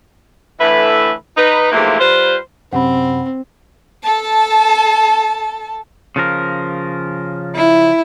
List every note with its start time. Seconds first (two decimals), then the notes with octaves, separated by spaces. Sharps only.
0.60 A2 D3 E3 B4 E5
1.37 D#4 B4
1.72 G#2 C3 E3 F3 A3 A#3
2.00 G3 F4 B4 C5
2.73 F#2 C3 C4 F#5 B5
4.03 A4 A5
6.16 C#3 F3 A#4
7.55 E4